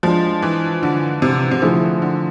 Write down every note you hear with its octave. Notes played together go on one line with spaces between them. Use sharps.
F3 G#3 D4 F4
E3
D3
C3
C3
D3 F3 A3 E4 G#4 C5
D3